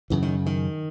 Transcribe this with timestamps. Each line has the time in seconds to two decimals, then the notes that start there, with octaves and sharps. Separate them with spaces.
0.10 F#2 C#3 E3
0.22 D#3
0.46 D#3